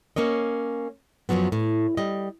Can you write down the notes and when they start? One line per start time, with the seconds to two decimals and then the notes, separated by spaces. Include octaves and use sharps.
0.16 A#3 C#4 C#5 D#5
1.29 F#2 B2 F3 F#3 B3
1.52 A2
1.97 G3 D#5